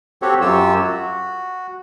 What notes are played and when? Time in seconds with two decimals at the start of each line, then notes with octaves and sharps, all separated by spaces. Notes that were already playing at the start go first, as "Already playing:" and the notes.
0.22 C4 F#4 G4 A4 C#5
0.41 F#2 F#3 F4 G4 C#5 E6
0.83 F#4